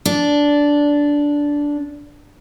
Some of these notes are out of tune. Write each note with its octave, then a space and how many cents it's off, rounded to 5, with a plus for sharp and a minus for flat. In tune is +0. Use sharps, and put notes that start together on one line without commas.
D4 -10